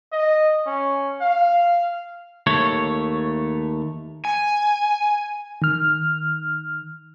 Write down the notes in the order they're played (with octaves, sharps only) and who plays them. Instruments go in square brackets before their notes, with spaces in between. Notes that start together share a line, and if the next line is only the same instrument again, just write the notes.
[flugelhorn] D#5
C#4
F5
[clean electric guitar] D#2 A3 C#5
[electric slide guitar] G#5
[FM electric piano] D#3 F6